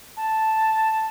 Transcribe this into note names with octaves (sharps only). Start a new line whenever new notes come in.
A5